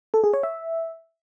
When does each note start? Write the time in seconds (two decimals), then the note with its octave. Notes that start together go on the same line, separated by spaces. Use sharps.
0.14 A4
0.24 G#4
0.33 C#5
0.43 E5